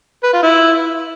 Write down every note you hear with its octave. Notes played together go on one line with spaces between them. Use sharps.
B4
F4
E4